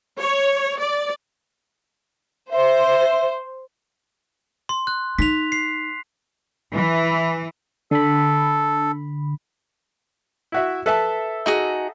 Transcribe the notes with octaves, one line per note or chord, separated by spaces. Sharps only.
C#5
D5
C5 E5
C6
F#6
D#4 B6 F7
C7
E3
D3 A4 B5
E4 F#4 E5
A4 B4 E5 A5
D#4 F#4 G#4